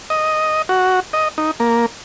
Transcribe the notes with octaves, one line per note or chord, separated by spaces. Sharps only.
D#5
F#4
D#5
D#4
A#3